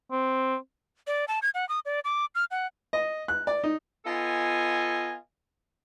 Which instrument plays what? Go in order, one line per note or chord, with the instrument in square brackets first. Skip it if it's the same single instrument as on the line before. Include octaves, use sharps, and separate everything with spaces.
[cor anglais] C4
[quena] D5
A5
G#6
F#5
D#6
D5
D6
F6
F#5
[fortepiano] D#5
F#6
D5
D#4
[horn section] B3 F4 A4 D#5 G#5